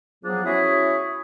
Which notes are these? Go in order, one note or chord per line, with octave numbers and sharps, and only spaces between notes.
F3 F#3 B3 D4 G#4
C#4 E4 F#4 G#4 E5